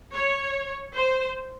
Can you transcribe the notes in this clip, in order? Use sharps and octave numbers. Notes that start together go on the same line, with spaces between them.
C#5
C5